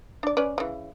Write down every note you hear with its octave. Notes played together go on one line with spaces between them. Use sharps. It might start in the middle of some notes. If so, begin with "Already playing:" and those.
D4 D5
C#4 B4 D5
C#3 E3